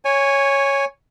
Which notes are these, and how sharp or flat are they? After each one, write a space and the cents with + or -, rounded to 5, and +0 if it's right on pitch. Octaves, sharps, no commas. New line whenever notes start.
C#5 +0 G#5 -15